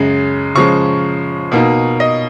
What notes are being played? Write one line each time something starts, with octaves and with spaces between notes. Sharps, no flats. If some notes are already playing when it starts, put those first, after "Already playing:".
Already playing: F#2 C#3 G#3
C#3 F3 G#3 C#6
B2 A#3 D#4
D#5